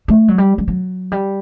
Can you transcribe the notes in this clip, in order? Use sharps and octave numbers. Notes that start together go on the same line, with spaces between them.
A3
F#3
G3
G3
F#3
G3